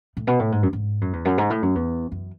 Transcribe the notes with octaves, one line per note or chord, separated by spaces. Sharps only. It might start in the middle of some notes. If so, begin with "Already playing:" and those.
A2
B2
A2
G#2
F#2
G#2
F#2
E2
F#2
G#2
A2
F#2
E2
F#2